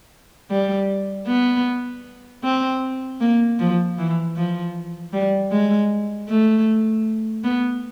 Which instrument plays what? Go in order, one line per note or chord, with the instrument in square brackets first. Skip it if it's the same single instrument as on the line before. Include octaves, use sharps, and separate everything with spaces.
[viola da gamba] G3
B3
C4
A#3
F3
E3
F3
G3
G#3
A3
B3